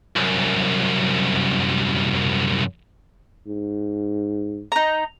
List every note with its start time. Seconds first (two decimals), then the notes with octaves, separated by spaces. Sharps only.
0.16 C2 F#2
3.48 G#2
4.72 D#4 A#5